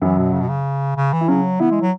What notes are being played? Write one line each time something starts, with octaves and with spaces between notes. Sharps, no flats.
F#2 E3 F#3
B2
C#3
B2
C#3
C#3
E3
E4
C#3 F#3 C#4
E3 B3 E4
G#3
F#3